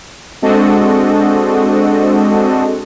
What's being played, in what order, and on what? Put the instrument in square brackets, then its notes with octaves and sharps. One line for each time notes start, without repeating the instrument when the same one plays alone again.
[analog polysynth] G#3 C4 D4 F#4 A4 D#5